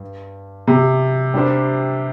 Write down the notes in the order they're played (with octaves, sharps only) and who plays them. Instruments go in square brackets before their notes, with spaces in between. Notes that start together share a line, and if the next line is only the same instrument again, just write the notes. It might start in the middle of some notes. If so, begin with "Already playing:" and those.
Already playing: [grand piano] G2
[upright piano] C3
[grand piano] G3 D4 G4 C5